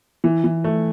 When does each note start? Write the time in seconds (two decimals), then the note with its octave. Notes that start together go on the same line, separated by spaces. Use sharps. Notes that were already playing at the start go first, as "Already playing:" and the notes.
0.24 E3
0.44 E3
0.64 A3